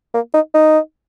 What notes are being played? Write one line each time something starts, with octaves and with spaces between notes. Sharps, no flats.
A#3
D#4
D#4